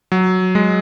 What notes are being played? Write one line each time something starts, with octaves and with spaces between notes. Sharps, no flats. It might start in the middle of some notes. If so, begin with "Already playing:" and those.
F#3
G#3